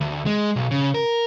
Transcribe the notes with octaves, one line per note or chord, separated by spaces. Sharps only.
D2
G#3
B1
C#3
A#4